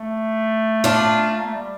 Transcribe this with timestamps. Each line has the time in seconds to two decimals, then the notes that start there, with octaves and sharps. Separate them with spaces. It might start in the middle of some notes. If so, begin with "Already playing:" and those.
Already playing: A3
0.84 D4 F4
1.38 A#3
1.46 A3
1.54 G3